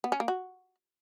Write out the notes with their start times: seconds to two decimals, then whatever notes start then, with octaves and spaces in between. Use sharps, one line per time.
0.04 B3
0.12 C#4
0.20 A#3
0.28 F#4